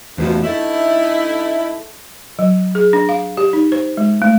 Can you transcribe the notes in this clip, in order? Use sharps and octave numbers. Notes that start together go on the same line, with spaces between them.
E2 G2 B2 F3 A3 F#4
D3 D#4 E4 A4 E5
F#3
G#4
D4
F5
G4
D#4
C5
G#3
A3